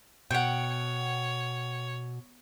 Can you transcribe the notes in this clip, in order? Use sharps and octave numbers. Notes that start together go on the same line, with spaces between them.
B2 C#5 F#5 G5